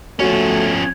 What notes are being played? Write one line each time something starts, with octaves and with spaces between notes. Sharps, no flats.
F3 A3 C#4 F#4 C#5